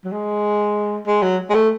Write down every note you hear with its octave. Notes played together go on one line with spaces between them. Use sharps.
F#3
G#3
G#3
F#3
G#3
A3